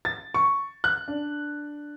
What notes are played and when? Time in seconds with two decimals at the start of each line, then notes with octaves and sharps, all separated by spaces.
0.05 A6
0.34 C#6
0.84 F#6
1.08 D4